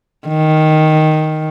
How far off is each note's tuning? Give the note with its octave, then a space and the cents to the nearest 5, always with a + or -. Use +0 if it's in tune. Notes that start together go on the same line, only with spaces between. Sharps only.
D#3 +0